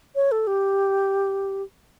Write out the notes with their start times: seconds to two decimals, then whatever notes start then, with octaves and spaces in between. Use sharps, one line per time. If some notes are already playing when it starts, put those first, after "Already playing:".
0.15 C#5
0.32 A4
0.47 G4